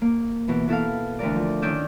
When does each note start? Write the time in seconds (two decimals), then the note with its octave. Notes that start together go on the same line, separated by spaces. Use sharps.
0.01 A#3
0.47 B2 E3 B3
0.68 B2 E4 A4 A#4 F5
1.19 D2 E3 A#4 D5
1.35 F3
1.62 D#3 C#4 D5 D#6 E6 G6